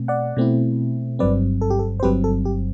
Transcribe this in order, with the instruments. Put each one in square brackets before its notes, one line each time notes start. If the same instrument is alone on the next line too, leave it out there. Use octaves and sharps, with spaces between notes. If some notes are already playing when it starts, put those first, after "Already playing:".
Already playing: [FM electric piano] B2 A3 C4
D5 F#5
B2 A3 C4 E4
G1 G2 F#3 C4 B4 D5
A4
G4
A4
C5
G1 G2 F#3 C4 G4 B4
A4
G4